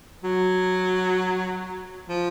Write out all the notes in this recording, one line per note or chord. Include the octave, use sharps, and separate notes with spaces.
F#3
F3